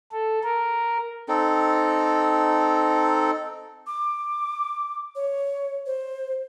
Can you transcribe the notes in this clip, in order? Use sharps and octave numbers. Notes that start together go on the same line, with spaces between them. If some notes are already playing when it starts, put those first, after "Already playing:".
A4
A#4
C4 D#4 A4
D6
C#5
C5